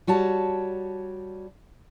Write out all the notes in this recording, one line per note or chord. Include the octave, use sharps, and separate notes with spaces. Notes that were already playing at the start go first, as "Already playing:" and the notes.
G3 F#4 C#5 A5